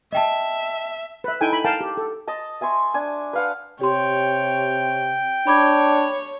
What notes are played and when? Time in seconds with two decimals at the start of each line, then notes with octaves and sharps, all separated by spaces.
0.12 D#5 E5 G5 A5
1.24 B4 E5
1.41 D#4 E4 A4 G5 G#5
1.53 B5
1.64 A#4 F5 G5 A5
1.81 G4
1.97 A4
2.27 D#5 A5
2.61 E5 G#5 C6 C#6
2.94 D4 G#5
3.33 B4 F5 F#5
3.81 C3 G4 C#5 G5 C6
5.47 D4 C#5 B5 D6 G#6